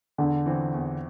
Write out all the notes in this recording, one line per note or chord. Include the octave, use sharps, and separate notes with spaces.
E2 D3
E3 C4
E2